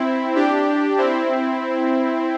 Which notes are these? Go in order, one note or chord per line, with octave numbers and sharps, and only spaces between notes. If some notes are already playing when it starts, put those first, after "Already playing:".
Already playing: C4 E4
D4 G4
C4 E4